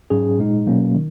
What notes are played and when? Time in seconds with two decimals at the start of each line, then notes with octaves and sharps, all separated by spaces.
0.10 G#2 F#3 C#4 G#4
0.39 A#2 G#3 D#4
0.67 B2 F#3 A#3 C#4
0.95 D#3